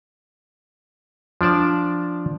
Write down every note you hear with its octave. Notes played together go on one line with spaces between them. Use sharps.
F3 D4 D5 A5